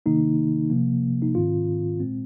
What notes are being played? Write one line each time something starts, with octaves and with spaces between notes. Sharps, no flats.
C3 D#3 A#3 D#4
C3 F3 A#3
D#4
G#2 D#3 C4 F4
A#2 G#3 C4